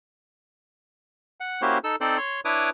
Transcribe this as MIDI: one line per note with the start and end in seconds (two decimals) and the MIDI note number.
1.40 1.62 78
1.62 1.78 58
1.62 1.78 61
1.62 1.78 64
1.62 1.78 66
1.62 1.78 67
1.62 1.78 72
1.84 1.96 63
1.84 1.96 69
1.84 1.96 88
2.01 2.18 60
2.01 2.18 63
2.01 2.18 69
2.01 2.18 72
2.01 2.18 74
2.18 2.40 73
2.18 2.40 84
2.45 2.70 62
2.45 2.70 64
2.45 2.70 71
2.45 2.70 73
2.45 2.70 86
2.45 2.70 87